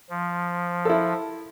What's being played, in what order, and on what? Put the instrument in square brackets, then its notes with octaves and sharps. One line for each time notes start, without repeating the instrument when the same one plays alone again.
[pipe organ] F3
[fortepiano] E4 A4